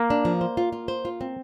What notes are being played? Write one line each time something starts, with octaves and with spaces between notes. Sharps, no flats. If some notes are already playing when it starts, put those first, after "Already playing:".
Already playing: A#3
D4
F3
C5
F4
F4
C5
F4
C4